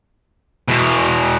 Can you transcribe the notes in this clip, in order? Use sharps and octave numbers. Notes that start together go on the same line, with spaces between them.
E2 B2